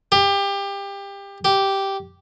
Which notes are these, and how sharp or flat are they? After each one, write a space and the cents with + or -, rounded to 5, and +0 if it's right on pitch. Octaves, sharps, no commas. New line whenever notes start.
G4 +25
G4 -5